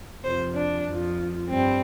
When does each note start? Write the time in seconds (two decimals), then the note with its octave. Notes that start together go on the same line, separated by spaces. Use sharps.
0.24 F2 C3 F3 C5
0.56 D4
0.87 F2 F3
1.50 G2 G3 C4